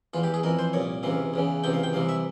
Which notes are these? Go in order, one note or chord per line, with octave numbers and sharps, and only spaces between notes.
E2 E3 F4
G4
G#4
F2 E3 A#4
C5
C2 A#2 C#5
C#2 C3 E3 F5
E2 C#3 E3
C#2 C3 E3 G5
F5
G5
C2 C3 E3 F5
E5